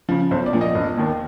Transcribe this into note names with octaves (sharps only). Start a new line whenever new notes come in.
C#3 F3
B1 C5
D5
A#2 F3
D#5
E1
D#2 D#3